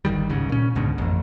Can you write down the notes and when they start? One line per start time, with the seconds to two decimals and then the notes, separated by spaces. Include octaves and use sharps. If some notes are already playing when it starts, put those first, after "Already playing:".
0.05 G1 D2 D#3 G3
0.29 C#2 G#2 C#3
0.49 A#2 C#4
0.75 C#2 G#2 B2 D3
0.98 A1 F2